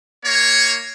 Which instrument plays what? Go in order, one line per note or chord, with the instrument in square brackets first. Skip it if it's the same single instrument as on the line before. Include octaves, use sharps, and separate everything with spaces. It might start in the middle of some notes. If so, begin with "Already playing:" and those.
[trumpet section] A#3 C#5